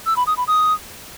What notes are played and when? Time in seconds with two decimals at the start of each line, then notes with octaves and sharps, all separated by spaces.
0.06 E6
0.17 B5
0.27 D#6
0.37 B5
0.48 D#6